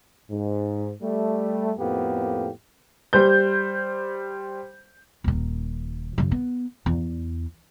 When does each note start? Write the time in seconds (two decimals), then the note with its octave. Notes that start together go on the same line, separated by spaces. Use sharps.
0.30 G#2
1.02 G3 A3
1.78 F2 A2 A#3 B3 G4
3.13 G3 C5 G6
5.24 D#1 D#3
6.18 F#2 C#3
6.31 B3
6.86 E2